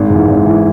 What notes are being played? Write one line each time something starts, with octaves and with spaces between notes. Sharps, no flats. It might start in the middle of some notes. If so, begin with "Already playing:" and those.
Already playing: G#1
G#2 E3
G#1
E3